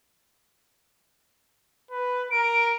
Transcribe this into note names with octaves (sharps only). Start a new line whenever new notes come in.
B4
A#4 D7